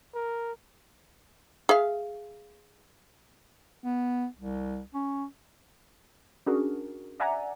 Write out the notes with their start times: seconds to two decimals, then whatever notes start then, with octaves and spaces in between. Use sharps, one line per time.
0.14 A#4
1.69 G#4 E5 F5
3.84 B3
4.36 C2
4.94 C#4
6.46 C#4 D4 F#4 G#4 A#4
7.20 D5 E5 F#5 G#5 A#5